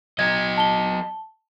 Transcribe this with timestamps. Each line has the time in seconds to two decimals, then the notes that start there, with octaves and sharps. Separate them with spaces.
0.19 F#3 D#5 G#6
0.57 A5 G7